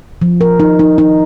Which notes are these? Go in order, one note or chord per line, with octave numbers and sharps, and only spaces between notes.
F3
A#4
D#4
D#4
D#4